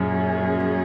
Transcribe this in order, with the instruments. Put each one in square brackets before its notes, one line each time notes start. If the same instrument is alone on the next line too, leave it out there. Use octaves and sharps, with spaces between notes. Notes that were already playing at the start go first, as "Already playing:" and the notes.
Already playing: [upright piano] F#2 [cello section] A#2 F#3 C#4 G#4